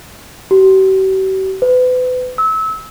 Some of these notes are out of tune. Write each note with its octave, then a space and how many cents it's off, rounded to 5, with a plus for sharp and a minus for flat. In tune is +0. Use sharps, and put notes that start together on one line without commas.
G4 -45
B4 +35
E6 -30